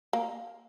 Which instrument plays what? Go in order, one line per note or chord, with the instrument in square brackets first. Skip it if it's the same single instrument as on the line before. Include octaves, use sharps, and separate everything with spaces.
[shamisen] A#3